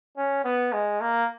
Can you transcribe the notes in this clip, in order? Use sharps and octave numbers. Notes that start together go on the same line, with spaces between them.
C#4
B3
G#3
A#3